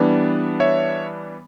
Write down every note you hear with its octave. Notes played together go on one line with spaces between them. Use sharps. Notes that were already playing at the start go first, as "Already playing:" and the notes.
Already playing: E3 G3 B3 D4
C#5 E5